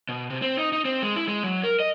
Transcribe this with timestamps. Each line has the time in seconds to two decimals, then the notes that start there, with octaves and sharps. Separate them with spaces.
0.09 B2
0.30 C3
0.42 C4
0.58 D#4
0.73 D#4
0.85 C4
1.02 G#3
1.16 E4
1.28 G#3
1.43 F#3
1.63 A#4
1.80 D#5